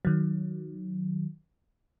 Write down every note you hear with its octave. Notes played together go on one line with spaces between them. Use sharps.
D#3 F#3